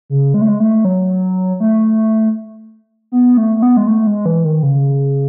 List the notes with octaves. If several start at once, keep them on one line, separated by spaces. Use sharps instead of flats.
C#3
G#3
A3
G#3
A3
F#3
A3
B3
A3
A3
B3
G#3
A3
G#3
E3
D#3
C#3